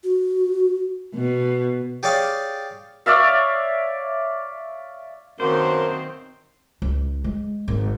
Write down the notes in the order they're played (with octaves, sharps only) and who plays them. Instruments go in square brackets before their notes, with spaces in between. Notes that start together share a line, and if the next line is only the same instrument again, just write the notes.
[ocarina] F#4
[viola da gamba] B2
[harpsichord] G4 G#4 C#5 D5 F5
[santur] C#5 D5 E5 F5
[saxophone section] F#2 B2 A#3 [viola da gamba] D#3 C4 [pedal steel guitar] C5
[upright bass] C#2
G#3
G#1